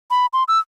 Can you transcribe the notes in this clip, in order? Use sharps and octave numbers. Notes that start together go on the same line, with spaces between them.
B5
C6
E6